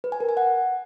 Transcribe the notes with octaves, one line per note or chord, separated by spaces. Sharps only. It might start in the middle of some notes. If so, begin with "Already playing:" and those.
B4
G#5
A#4
G#5
F#5